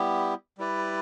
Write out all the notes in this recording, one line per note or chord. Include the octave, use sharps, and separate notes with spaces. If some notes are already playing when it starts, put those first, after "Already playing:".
Already playing: G3 B3 E4 G4
G3 E4 B4 D5